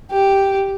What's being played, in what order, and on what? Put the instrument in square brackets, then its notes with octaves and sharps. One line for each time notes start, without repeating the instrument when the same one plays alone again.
[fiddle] G4